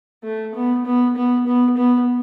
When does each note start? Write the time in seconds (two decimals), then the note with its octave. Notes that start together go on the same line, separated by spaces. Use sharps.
0.23 A3
0.55 B3
0.86 B3
1.16 B3
1.47 B3
1.77 B3